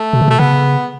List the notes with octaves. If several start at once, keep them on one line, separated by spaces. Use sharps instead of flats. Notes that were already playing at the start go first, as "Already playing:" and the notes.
Already playing: A3
B2
C#3
B2 A3
C#3 B3